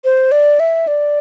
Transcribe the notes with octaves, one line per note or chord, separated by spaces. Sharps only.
C5
D5
E5
D5